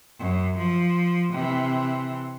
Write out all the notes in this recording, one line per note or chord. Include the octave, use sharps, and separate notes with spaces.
F#2
F3
C3 E3